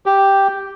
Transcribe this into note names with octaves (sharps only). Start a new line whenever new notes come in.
G4